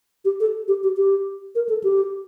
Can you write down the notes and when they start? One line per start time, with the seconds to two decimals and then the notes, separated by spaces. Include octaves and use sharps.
0.25 G4
0.40 A4
0.68 G4
0.83 G4
0.97 G4
1.55 A#4
1.69 A4
1.84 G4